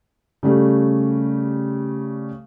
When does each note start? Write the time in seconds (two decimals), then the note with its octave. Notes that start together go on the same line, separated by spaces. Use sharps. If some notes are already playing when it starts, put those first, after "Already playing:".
0.43 C#3 G3 A3